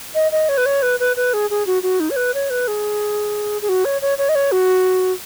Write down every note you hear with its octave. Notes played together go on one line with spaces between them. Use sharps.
D#5
D#5
C#5
B4
C#5
B4
B4
B4
G#4
G#4
F#4
F#4
D#4
C#5
B4
C#5
B4
G#4
G#4
F#4
C#5
C#5
C#5
D#5
C#5
F#4